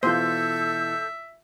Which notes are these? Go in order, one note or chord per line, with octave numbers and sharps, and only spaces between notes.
B2 E3 F4 A4 C5 E5 E6 G6